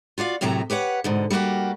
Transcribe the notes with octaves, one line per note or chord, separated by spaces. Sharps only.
F4 F#4 D5 F5
F#2 A2 C3 F#3 A3 A#5
G4 B4 C#5 F#5
G#2 B2 D3
G3 A#3 B3 F#4 G4